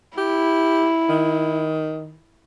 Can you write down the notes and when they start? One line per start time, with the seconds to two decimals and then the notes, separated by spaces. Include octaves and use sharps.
0.17 E4 G4
1.09 D#3